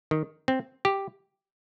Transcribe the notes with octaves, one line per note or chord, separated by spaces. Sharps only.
D#3
C4
G4